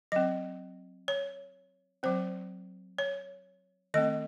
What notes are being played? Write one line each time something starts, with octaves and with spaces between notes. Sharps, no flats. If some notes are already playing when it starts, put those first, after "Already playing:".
F#3 C4 D#5
C#5
F#3 C4 C5
C#5
D#3 A3 C4 D#5